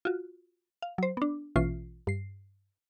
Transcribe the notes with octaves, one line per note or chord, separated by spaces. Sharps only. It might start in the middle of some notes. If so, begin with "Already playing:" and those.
F4 F#4
F5
F#3 C5
B3 D4
A#1 B2 E3 C#4 F4 C7
G2 C7